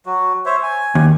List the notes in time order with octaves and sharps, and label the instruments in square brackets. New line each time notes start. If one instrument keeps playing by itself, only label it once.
[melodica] F#3 F#4
C5 C#5 E5
G#5
[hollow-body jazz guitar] D#2